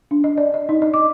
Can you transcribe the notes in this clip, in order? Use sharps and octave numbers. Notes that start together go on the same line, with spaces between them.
D4
D#5
D5
D#5
D#4
D#5
D6